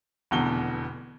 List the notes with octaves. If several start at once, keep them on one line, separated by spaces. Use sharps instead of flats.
F1 E2 B2 D3 G7